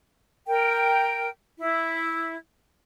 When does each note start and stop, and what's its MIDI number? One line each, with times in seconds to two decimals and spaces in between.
0.47 1.28 70
0.47 1.28 79
1.59 2.35 64